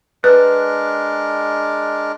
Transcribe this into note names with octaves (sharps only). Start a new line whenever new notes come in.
G#3 D4 A#4 B4 F#6